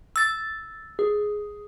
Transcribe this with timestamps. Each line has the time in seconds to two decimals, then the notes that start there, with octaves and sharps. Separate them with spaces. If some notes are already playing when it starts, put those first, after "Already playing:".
0.16 E6 A6
0.99 G#4